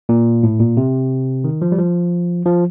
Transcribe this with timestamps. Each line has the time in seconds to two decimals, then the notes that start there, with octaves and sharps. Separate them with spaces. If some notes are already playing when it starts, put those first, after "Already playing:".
0.09 A#2
0.43 A2
0.59 A#2
0.77 C3
1.44 D#3
1.62 F3
1.72 G3
1.78 F3
2.46 F3